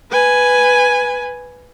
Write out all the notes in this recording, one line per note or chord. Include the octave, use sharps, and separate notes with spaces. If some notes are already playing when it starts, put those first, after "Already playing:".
B4 G#5